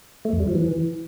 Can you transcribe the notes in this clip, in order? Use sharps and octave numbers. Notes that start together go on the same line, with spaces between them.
A3
F2
G3
F3
E3